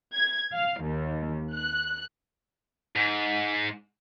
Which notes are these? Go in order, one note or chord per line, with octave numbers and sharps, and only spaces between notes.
G#6
F5
D#2
F#6
G#2